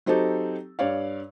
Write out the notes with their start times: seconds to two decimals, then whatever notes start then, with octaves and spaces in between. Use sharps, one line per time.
0.06 F#3 C4 D#4 G4 A4
0.79 G2 C#5 D5 F5